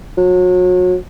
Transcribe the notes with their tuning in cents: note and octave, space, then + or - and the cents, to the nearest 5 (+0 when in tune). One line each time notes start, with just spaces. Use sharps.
F#3 -30